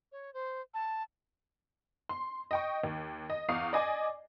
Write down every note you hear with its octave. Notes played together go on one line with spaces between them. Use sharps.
C#5
C5
A5
C6
D#5 G5 C#6
D#2
D#5
E2 F5 C#6 D#6 C7
D5 D#5 G#5 D6